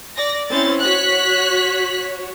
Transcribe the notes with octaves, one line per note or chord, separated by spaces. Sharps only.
D5 A#6
C4 C#4 E4 A6
F#4 C#5 F#6 B6